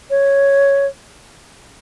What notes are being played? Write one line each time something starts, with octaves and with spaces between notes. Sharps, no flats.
C#5